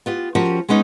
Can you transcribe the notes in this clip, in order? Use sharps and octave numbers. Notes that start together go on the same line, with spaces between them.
B3 F4 G4
F3 C#4 F#4 G4 A#4
G#3 B3 C#4 D#4